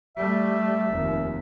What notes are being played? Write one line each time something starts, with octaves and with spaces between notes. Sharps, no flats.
G3 A3 E5
F1 D#2